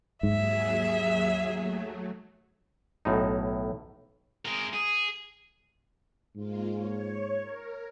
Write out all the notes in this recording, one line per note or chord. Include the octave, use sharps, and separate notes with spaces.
D#2 G#2 F#3 G#4 E5
F#3 A3
B1 A2 D#4
G#3 A#4
G#4
G#2 G#3 A#3 F4
C#5
A#4